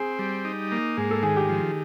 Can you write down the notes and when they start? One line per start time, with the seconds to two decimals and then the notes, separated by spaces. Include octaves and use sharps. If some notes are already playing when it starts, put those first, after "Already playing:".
Already playing: C4 G#4
0.19 G3
0.45 D#4
0.72 A#3
0.97 G#2 G#4
1.11 A4
1.23 D#3 G#4
1.37 G4
1.49 F3